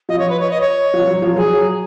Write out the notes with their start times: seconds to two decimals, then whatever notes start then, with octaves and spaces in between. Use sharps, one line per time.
0.09 F3 D#5
0.19 C#5
0.29 B4
0.40 C#5
0.50 D#5
0.61 C#5
0.94 F3
1.07 F#3
1.22 F3
1.36 F#3 G#4